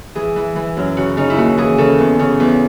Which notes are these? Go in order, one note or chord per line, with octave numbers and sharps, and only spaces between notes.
E3 G#4
E3
E3
F#2
C#3 F#4
C#3 D#4
E4
D#2 F#4
E3 G#4
C#3 A4
E2
C#3
E2